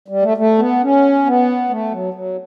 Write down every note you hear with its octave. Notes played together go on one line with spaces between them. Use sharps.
G3
A3
A3
B3
C#4
B3
A3
F#3
F#3